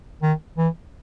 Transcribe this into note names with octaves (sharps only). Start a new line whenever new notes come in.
D#3
E3